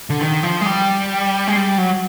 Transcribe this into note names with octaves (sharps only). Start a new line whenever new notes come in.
D3
D#3
F3
G#3
G3
G#3
G3
F#3